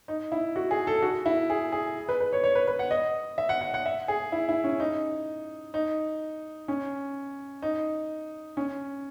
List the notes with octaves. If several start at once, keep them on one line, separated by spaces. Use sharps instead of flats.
D#4
E4
F#4
G#4
A4
F#4
E4
G#4
G#4
B4
B4
C#5
C#5
B4
B4
F#5
D#5
E5
F#5
F#5
F#5
E5
G#4
E4
E4
C#4
D#4
D#4
C#4
D#4
C#4